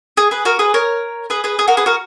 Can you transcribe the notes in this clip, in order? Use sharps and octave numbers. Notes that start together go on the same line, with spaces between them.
G#4
G#4 B4
F#4 A#4
G#4 B4
A#4 C#5
G#4 B4
G#4 B4
G#4
F#4 A#4
G#4 B4
F#4 A#4